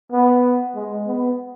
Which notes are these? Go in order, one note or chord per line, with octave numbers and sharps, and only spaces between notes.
B3
G#3
B3